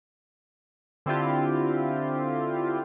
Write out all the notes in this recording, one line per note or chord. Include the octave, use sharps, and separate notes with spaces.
D3 C4 E4 F4 G4